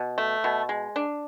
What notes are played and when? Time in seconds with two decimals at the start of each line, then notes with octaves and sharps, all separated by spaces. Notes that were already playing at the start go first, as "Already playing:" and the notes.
Already playing: B2
0.18 A3
0.44 B2
0.69 G#3
0.96 D4